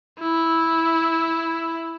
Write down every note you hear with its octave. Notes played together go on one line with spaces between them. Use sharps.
E4